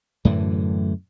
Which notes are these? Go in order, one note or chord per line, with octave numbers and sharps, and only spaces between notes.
F#2 A2 D3 E3